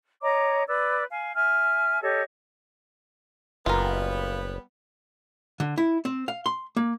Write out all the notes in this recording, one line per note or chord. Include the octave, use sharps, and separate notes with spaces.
C#5 D#5 A#5 D6
B4 D5 D6 E6
F5 G#5
E5 G#5 F6
G4 A4 C#5 D#5
F#1 G3 B3 F4 A#4
D3
E4
C4
F5
C6
A#3